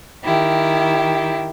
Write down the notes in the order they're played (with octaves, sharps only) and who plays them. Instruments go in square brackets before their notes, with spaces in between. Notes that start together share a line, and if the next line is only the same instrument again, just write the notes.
[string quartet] D#3 E4 G4